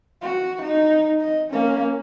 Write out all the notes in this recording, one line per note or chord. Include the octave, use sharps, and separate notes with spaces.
F#4
D#4
D#5
A#3 C#4